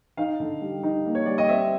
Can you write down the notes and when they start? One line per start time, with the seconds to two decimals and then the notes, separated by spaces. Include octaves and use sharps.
0.17 D#4 F5
0.40 D3
0.62 G3
0.83 D#4
1.06 A#3
1.15 C#5
1.26 G3 D5
1.38 D#5
1.49 C4 E5